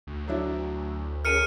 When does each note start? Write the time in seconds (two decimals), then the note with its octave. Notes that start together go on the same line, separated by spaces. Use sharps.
0.07 D2
0.28 F#3 D4 E4
1.25 C#4 G#4 A#4 F6 C#7 D#7